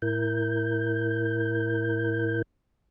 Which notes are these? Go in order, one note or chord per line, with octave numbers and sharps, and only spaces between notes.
A2 E4 A#4 G6